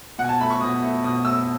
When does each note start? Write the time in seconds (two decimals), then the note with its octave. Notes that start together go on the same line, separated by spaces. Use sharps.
0.18 B2 F#5
0.24 G#5
0.29 A5
0.40 A3 B5
0.50 C#6
0.61 B2 D#6
0.83 A3
1.04 B2 D#6
1.25 A3 E6